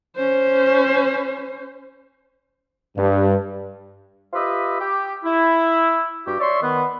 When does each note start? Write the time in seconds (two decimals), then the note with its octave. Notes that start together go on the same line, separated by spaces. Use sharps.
0.17 C#4 C5
2.97 G2
4.33 F4 G4 B4 D#5 E5
4.81 G4
5.24 E4
6.26 G2 F#4 G4
6.39 C#5 D5 E5 C6 C#6
6.61 D#3 B3